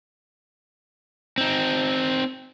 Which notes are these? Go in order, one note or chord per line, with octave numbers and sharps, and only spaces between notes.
C4 D#4